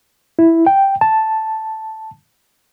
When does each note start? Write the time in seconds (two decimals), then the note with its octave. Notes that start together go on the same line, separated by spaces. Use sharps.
0.39 E4
0.67 G5
1.01 A5